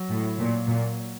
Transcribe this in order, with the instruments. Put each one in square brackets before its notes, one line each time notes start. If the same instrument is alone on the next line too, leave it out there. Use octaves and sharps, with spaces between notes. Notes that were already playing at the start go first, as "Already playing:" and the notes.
Already playing: [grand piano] F#3
[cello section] A2
A#2
A#2